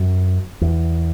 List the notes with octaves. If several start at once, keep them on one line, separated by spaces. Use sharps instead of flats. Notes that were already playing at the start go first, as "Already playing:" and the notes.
Already playing: F#2
E2